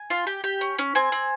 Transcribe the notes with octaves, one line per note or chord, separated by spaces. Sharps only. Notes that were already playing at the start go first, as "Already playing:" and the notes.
Already playing: G#5
F4
G4
G4
C#4
C#4
C4 G#5
C4